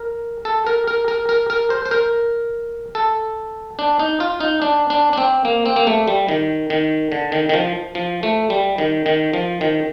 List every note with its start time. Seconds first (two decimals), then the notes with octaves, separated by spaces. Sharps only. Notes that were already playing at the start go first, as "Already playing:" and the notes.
Already playing: A#4
0.45 A4
0.67 A#4
0.87 A#4
1.08 A#4
1.29 A#4
1.50 A#4
1.70 C5
1.85 C5
1.91 A#4
2.95 A4
3.79 D4
3.99 D#4
4.20 F4
4.41 D#4
4.62 D4
4.90 D4
5.13 D4
5.18 C4
5.45 A#3
5.66 C4
5.76 A#3
5.87 A3
6.07 G3
6.29 D#3
6.70 D#3
7.12 D3
7.32 D#3
7.49 D#3
7.54 F3
7.95 F3
8.23 A3
8.50 G3
8.78 D#3
9.06 D#3
9.33 F3
9.61 D#3